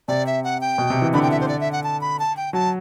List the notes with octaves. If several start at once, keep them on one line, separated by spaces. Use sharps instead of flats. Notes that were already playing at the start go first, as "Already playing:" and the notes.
C3 D5
E5
F#5
G5
B2
C3
E3
D3 B5
G5
E5
C5
D5
E5
F#5
A5
B5
A5
G5
F#3 A5